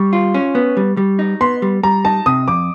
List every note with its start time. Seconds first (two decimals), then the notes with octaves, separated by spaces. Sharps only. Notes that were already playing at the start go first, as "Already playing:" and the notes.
Already playing: G3 C#6
0.13 F4
0.34 C#4
0.55 B3
0.77 G3
0.97 G3
1.19 D#4
1.41 B3 C6
1.62 G3
1.83 G3 A#5
2.05 D#4 A5
2.26 C3 D#6
2.48 F2 D6